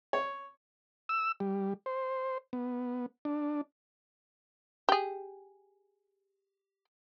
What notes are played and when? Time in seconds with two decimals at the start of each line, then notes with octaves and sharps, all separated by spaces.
0.13 C#5
1.09 E6
1.40 G3
1.86 C5
2.53 B3
3.25 D4
4.89 G4 G#4